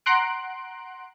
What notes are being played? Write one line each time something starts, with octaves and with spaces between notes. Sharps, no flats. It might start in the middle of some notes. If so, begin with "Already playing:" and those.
F#5 A#5 C6 F#6 D7